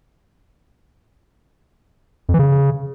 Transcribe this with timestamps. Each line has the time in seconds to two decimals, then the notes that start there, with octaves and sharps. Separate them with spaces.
2.29 F2
2.34 E3
2.39 C#3